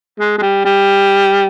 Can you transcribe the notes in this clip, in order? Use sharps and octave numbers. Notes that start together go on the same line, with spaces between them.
G#3
G#3
G3
G3